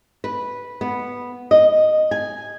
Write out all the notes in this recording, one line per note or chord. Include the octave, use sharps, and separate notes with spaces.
B4
B3
D#5
G#5